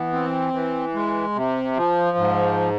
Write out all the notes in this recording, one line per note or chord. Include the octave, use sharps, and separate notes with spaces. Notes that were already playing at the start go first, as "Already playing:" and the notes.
Already playing: E3 B3
C4
E3
G#3
C3
F3
G#2